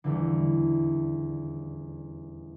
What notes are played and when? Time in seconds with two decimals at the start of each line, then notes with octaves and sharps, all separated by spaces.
0.04 D#1 E2 D3